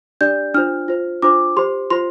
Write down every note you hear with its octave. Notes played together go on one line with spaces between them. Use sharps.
D4 G4 D5 G6
D4 F4 C5 F6
F4 C5
D4 F4 C5 D6
G4 C5 C6
F4 C5 C6